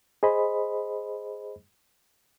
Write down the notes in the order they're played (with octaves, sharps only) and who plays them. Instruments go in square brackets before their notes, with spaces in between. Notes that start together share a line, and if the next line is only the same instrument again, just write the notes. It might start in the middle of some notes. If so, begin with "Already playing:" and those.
[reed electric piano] G#4 C5 D#5 B5